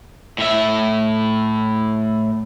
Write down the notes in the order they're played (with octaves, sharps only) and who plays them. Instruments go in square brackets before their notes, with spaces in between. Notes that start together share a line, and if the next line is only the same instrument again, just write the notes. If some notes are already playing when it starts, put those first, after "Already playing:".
[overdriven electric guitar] A2 E5